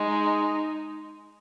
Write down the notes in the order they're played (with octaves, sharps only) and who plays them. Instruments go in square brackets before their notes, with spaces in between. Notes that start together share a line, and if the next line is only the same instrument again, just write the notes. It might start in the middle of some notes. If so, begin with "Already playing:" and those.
Already playing: [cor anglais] G#3 [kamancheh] D#4